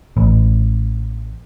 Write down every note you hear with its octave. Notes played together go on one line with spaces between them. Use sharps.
A1